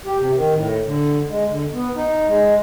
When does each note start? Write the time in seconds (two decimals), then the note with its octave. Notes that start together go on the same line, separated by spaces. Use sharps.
0.05 G4
0.18 C3
0.35 D#3
0.55 A2
0.84 D3
1.29 G#3
1.46 D3
1.73 B3
1.96 D#4
2.27 G#3